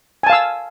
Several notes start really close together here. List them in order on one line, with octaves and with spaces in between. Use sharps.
G#5 A5 F5 E6